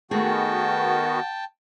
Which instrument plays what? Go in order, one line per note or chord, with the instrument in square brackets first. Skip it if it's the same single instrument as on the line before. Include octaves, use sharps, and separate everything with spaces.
[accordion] D#3 B3 F#4 [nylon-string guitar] A3 G#4 [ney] F#5 [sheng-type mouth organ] G5 A5